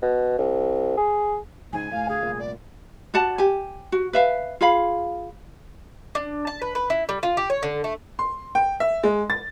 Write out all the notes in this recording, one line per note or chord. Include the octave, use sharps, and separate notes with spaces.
B2
C2
G#4
C#2 G#2 D#4 G#5
F1 A2 F5
D2 G#4
C2 A#2
D5
F#4 D5 F#5 A5
G4 G#5
F#4
B4 E5 F5
F4 G#4 F5 B5
D4
A5
B4
B4
E4
G3
F4
G4
C#5
D3
A3
C6
G5
E5
G#3
A6